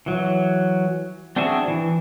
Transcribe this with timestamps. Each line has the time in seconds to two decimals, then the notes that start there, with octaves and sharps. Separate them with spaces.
0.06 E3 F#3
1.36 C4 D4 F#4 G#4 E5
1.68 E3